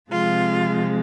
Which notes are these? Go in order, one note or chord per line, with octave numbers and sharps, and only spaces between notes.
C3 F3 G#3 F4